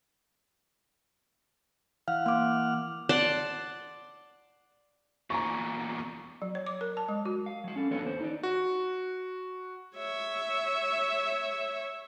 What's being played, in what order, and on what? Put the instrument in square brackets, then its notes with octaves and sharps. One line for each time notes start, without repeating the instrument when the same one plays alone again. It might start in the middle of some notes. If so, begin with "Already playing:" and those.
[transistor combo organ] E3 F#5 F6 [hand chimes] F5
[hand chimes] A#3 D6
[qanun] D5 F#5 A5 C6
[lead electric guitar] E2 A#2 [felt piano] A#5 C#6
[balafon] F#3
C#5
D6
A#4
A5
G#3
F#4
[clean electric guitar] F5
F#3 F5
C#4 A4
E3 A#3 B3 D4 A4 C#5
D#2 C5
D#4 D5
[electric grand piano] F#4
[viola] C#5 E5